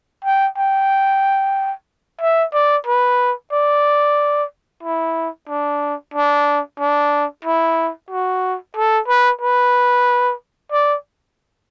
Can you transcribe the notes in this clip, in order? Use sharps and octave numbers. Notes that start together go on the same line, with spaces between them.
G5
G5
E5
D5
B4
D5
E4
D4
D4
D4
E4
F#4
A4
B4
B4
D5